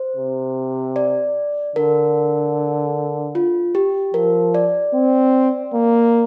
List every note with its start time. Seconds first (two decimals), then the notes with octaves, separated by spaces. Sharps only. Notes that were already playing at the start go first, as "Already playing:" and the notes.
Already playing: C5
0.17 C3
0.96 D5
1.76 D3 A#4
3.35 F4
3.75 G4
4.14 F3 A#4
4.55 D5
4.94 C4
5.73 A#3